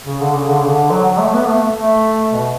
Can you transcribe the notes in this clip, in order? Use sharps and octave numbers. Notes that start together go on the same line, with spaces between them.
C#3
D3
C#3
D3
C#3
D3
F#3
F#3
A3
B3
A3
A3
B2